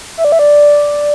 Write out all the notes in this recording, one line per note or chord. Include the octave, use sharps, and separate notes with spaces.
E5
D5
E5
D5